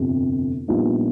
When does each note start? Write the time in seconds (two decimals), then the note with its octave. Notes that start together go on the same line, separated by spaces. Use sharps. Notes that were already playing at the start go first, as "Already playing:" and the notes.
Already playing: G1 F2 C3
0.68 A#1 A#2 G3 B3 D#4